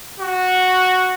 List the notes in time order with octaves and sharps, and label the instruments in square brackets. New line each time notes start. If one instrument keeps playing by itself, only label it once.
[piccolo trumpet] F#4